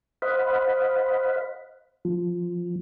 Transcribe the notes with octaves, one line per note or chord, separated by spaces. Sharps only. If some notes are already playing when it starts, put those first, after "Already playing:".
C5 D#5 F5 F#5 B5
F3